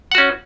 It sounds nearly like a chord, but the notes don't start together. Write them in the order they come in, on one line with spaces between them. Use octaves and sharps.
F#5 F#4 C#4